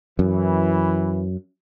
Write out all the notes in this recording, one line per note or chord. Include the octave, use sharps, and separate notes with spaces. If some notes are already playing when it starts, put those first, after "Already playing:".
F#2 E3